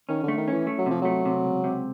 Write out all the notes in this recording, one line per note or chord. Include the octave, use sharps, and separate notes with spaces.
D#3 C#4
D3 A3
D#3
E3 C#4
A3
F#3
C3 F3
F#3 A3
C3
C#2
C3